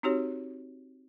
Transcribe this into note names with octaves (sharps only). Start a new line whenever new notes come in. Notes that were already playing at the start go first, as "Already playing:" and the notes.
C4 D#4 F#4 G4 C#5